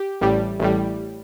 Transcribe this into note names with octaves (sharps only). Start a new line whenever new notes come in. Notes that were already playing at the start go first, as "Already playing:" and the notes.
Already playing: G4
A1 A2 G3
A1 A2 G3